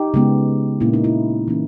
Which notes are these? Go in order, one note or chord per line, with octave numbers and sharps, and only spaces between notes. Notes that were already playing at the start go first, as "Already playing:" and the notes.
Already playing: D#4 G4
C#3 G#3 B3
A#2 A#3 C#4 E4
D#4
E4
E3 A#3 C#4